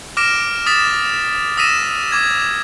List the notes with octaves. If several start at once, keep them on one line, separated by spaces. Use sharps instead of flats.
D6 F6 A#6 D7 E7
D#6 A6 B6 E7
D#6 E6 A#6 B6 D#7 E7
D6 G#6